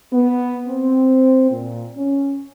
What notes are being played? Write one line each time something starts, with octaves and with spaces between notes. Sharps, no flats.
B3
C4
A#2
C#4